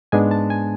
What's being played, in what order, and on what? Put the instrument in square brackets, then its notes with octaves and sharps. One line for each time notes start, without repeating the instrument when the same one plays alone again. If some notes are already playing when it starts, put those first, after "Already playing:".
[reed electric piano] G#2 G#3 B3 D4 G#5
A5
G#5